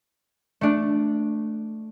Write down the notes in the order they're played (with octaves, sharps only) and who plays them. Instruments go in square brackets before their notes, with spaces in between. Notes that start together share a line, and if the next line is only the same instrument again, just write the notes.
[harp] A3 D4